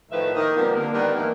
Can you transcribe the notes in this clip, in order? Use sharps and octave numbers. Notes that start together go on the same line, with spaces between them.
A2 D#3 F3 A3 B4 E5
D#3 A#3 D#5
C3 F3 G3 A#3 B3
D3 A#3
D#3 G3 B3 D4
G2 D#3 E3 A#3